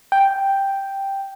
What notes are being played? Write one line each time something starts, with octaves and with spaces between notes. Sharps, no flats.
G5